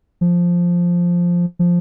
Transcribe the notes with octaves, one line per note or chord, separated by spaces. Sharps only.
F3
F3